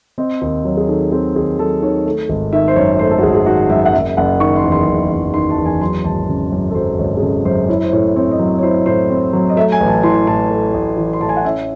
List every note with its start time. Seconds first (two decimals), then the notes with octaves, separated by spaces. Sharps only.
0.18 C4 D#5
0.42 D#2
0.65 F#3 C#5
0.77 G#4
0.88 D#3 A4
1.12 C4 G#4
1.35 D#2 G#4
1.59 F#3 A4
1.82 D#3 C#5
2.06 A3
2.29 G#1
2.53 D#3 E5
2.68 C5
2.76 F#2 C#5
2.94 C#5
2.99 A3 C5
3.11 A4
3.18 F#4
3.23 G#1 G#4
3.35 G#4
3.46 D#3 F#4
3.70 F#2 E5
3.85 F#5
3.93 F#1 E5
4.17 F#1 F#5
4.40 D#3 C#6
4.56 C6
4.64 E2
4.72 C6
4.87 F#1
5.11 F#1
5.34 D#3 C6
5.50 A5
5.58 E2
5.66 G#5
5.81 F#3 C6
6.05 G#1 A5
6.28 C#3
6.52 F#2
6.70 A4
6.75 F#3 C5
6.98 G#1 C#5
7.17 G#4
7.22 C#3 A4
7.45 F#2 C5
7.69 E4 C#5
7.84 C5
7.92 A2 C#5
8.16 C4 C#5
8.31 D#5
8.39 F#3
8.58 C#5
8.63 E4 C5
8.86 A2 C5
9.09 C4
9.33 F#3
9.49 D#5
9.56 A3 E5
9.72 G#5
9.80 A1
9.88 A5
10.03 E3 C6
10.27 A2 A5
10.51 A3
10.74 A1
10.97 E3
11.13 C6
11.21 A2 A5
11.29 G#5
11.37 F#5
11.45 C#4 E5